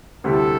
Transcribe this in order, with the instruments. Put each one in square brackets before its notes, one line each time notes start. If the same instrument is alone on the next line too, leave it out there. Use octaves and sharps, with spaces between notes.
[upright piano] D2 C3 G3 C4 E4 [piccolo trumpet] A4